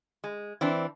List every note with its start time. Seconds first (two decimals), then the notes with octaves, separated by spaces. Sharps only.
0.24 G#3
0.61 E3 C4 D4